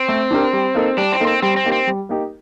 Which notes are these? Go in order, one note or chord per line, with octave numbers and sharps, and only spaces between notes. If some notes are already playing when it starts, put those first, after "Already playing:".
Already playing: C4
A3
D4 G4 A#4
G3
A#3 D#4 A4
G3 D4
C4
A#3 D#4 A4
C4
G3 C4
C4
A#3 D#4 G4
C4
G3
A#3 D#4 G4